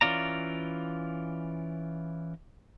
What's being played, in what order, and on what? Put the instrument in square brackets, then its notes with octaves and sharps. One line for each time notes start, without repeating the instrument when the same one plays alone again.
[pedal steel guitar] E3 C#4 F4 D5 A#5